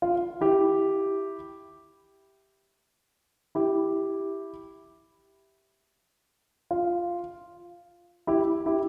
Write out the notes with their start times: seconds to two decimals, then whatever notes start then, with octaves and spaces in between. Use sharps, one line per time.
0.02 F4
0.41 E4 G4
3.55 E4 G4
6.71 F4
8.27 E4 G4
8.66 E4 G4